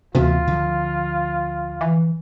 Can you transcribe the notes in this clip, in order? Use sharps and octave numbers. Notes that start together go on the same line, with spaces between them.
D2 C3 E3 B3 F4
D3 F3
E3